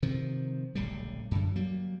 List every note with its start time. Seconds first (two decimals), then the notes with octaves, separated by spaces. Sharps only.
0.02 C3 D#3 F3
0.75 D1 A#1 C#3 G3
1.31 F#2 D3
1.56 F#3 G3 A#3